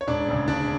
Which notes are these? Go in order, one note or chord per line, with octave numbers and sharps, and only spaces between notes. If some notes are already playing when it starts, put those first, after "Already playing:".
C#5
E1 D4 D5
D2 C#3
E1 D4 D5